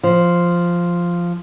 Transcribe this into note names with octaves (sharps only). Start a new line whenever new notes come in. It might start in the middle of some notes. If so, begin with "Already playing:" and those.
F3